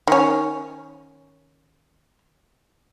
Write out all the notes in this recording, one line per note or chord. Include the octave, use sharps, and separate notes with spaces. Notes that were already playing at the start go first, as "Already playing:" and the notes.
D#3 C#4